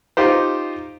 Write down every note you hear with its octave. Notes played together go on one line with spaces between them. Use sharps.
D#4 F4 G4 C5